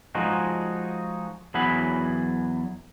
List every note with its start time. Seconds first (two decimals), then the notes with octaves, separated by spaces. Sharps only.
0.15 F3 G#3 D#4 F#4
1.54 E2 F#3 E4 G#4 F#5 B5